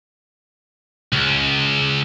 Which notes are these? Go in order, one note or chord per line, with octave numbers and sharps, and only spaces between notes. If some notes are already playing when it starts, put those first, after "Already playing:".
C#2